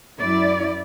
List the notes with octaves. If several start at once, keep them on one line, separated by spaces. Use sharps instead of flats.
F#2 E4 D5